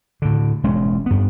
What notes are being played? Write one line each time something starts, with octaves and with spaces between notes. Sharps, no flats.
A2 D3
E1 G#3 C#4
G2 B3